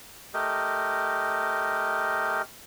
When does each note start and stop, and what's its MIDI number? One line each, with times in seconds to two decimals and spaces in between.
0.34 2.42 57
0.34 2.42 67
0.34 2.42 70
0.34 2.42 75